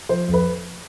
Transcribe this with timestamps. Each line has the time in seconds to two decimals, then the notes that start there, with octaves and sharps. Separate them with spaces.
0.09 F3 C5
0.28 F2
0.34 B4